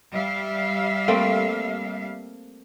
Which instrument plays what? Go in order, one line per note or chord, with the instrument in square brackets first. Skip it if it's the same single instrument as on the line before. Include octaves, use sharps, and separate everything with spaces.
[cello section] G3 E5 F5
[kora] A3 A#3 C4